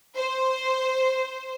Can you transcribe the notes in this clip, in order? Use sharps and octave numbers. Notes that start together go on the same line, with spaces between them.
C5